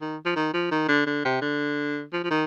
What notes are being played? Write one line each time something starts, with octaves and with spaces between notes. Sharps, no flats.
D#3
F3
D#3
F3
D#3
D3
D3
C3
D3
F3
F3
D#3